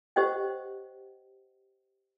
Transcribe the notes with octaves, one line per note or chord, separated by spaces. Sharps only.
G4 C5 C#5 D#5 F#5 G5